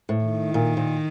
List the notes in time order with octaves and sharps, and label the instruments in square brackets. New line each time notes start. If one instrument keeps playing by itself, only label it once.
[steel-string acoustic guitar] A2
[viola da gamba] D#3
[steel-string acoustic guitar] A#2
A#2